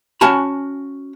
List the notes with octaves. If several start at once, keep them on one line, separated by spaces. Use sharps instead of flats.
C#4 F#4 G#5 A5 B5